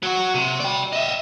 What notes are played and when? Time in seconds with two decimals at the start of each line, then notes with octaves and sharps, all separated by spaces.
0.03 F#3 F#4
0.35 C3
0.60 D5 G5
0.93 D#5 E5